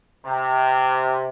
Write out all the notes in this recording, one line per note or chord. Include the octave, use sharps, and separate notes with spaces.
C3